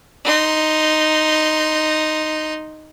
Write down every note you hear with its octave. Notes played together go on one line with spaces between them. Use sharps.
D#4 C6